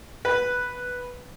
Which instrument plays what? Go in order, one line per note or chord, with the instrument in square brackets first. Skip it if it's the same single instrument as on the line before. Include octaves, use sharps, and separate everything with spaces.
[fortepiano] B4